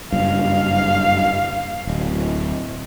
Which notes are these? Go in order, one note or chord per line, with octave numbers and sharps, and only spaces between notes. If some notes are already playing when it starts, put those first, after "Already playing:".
F#1 G2 F5
D1